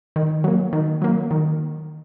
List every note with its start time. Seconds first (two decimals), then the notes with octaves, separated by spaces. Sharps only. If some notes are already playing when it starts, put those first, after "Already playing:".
0.16 D#3
0.44 F#3 A#3
0.73 D#3
1.02 F#3 A#3
1.31 D#3